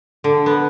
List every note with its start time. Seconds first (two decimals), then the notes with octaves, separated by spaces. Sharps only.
0.24 D3
0.46 B3